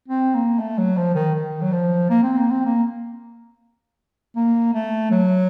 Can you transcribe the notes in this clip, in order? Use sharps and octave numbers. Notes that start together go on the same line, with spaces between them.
C4
A#3
A3
F#3
F3
D#3
D#3
F#3
F3
A#3
C4
A#3
C4
A#3
A#3
A3
F#3